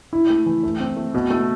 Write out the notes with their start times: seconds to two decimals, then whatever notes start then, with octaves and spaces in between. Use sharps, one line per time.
0.13 E4
0.30 A3
0.46 E3
0.63 A3
0.80 C4
0.96 A3
1.14 B2
1.30 A3